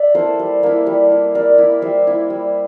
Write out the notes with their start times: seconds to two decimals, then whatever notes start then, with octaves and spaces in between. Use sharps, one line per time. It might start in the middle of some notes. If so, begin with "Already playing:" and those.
Already playing: D5 E5
0.14 A#3 E4 A4 C5
0.39 G3
0.63 A#3 E4
0.87 G3
1.10 A#3 E4
1.35 G3 A#4 D5
1.58 A#3 E4
1.82 G3 C5 E5
2.07 A#3 E4
2.30 G3